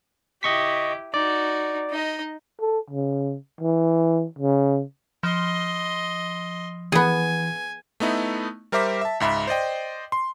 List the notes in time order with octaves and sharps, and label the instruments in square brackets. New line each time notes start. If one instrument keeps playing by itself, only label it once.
[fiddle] E4 G4 [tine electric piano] D#5 C#6 B6
[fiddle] D#4 F#4 [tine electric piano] D5
[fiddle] D#4 D#5
[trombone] A4
C#3
E3
C#3
[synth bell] F3 [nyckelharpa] D#5 C6
[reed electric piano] E3 [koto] B3 G#4 [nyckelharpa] G#5
[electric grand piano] A3 B3 D#4 E4
G3 A#4 C5 E5 D6 B6
E5 A5
C#2 G#2 E5 B5
C5 D5 D#5 G5
C6